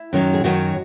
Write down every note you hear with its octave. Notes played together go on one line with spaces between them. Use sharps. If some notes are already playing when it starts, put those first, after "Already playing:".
Already playing: E4
F#2 D#3 F#3
G#4
F#2 D#3 F#3 F#4